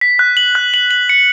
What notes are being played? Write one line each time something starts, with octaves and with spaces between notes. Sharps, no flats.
B6
F#6
F#7
F#6
F#7
F#7
C#7